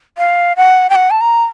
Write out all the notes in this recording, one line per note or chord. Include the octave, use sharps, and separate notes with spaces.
F5
F#5
G5
F#5
A5
A#5